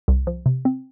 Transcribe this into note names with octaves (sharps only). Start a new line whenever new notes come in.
C2
F3
C3
C4